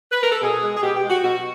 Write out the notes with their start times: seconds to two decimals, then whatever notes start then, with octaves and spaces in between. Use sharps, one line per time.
0.12 B4
0.22 A#4
0.31 A4
0.41 B2 G#4
0.62 G#3
0.76 G#4
0.82 B2 G4
0.96 G4
1.03 G#3
1.09 F#4
1.23 B2 F#4